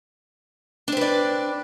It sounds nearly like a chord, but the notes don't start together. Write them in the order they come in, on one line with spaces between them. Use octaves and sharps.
D4 C4 B4 D5